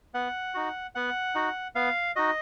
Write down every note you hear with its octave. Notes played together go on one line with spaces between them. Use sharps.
B3 F#5
D#4 F#4
B3 F#5
D#4 F#4
B3 F5
D#4 F#4 D#5